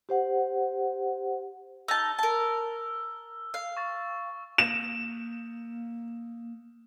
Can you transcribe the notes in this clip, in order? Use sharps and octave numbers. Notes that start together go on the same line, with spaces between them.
G4 C5 F#5
D#4 A5 E6 F6
A#4 A5
F5
C#6 A6
A#3 E7